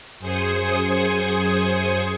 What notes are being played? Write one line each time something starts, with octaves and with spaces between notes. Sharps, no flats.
F#2 G#4 C5 D#6 G#6 C#7